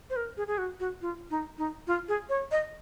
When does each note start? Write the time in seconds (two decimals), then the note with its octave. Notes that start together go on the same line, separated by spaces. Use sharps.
0.10 C5
0.16 A#4
0.37 G#4
0.47 G#4
0.58 F#4
0.80 F#4
1.01 F4
1.30 D#4
1.58 D#4
1.87 F4
2.08 G#4
2.29 C#5
2.51 D#5